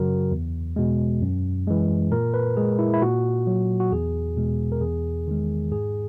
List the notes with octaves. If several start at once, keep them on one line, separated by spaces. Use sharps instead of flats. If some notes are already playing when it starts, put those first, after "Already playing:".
Already playing: F#2 C#3 F#3 F#4 A#4
E2
B2 G#3
F#2
E3 G#3
A#2 A#4
B4
G#3 G#4
E4
E4
A#2 F#4
F#3
F#4
E2 G#4
B2 G#3
A#4
E2 G#4
D#3 G#3
G#2 G#4